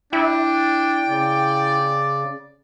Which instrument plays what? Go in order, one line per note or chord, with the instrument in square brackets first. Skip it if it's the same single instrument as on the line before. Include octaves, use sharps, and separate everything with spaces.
[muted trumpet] D4 [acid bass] E4 [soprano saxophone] G5
[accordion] C#3 [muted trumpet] D5